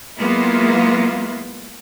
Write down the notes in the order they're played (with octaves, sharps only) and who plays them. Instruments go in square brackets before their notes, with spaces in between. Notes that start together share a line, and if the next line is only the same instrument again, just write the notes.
[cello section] F#3 G#3 A#3 B3 E4 F4